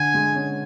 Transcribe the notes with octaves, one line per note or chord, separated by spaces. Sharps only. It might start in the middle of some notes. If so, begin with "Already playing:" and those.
Already playing: D3 G#5
G#3
C#4